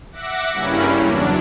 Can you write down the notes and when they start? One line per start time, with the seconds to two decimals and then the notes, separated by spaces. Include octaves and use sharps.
0.12 E5 F#5 D6 F#6 A#6
0.54 G2 C#3 G3 A#3 C#4 E4
0.98 E2 F#3 D4